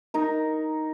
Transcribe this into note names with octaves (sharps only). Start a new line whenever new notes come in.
D#4 A#4